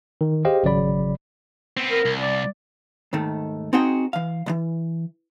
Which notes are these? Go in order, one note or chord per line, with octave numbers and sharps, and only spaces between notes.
D#3
G4 G#4 C5 D#5 F5 G5
G#1 C#3 F#3 D5 B5
B3 C4
A#4
C2
D5
D#2 G#2 D#3 A3
C4 D#4 F#4 G#4 F#5 G5
E3 F5
C2 E3